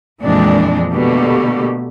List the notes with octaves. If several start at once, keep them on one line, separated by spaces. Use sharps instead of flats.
F2 A#2 E3 G#3 C4 D4
B2 D3 A3 A#3 G4